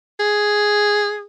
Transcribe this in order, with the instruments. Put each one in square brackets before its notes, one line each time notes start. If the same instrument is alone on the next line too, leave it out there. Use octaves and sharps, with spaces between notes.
[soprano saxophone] G#4